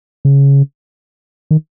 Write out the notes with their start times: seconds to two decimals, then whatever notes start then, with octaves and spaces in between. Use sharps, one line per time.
0.25 C#3
1.51 D#3